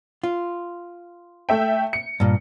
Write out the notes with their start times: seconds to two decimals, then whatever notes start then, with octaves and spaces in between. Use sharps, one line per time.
0.24 F4
1.49 A3 E5 G5
1.93 C#7
2.20 G2 A#2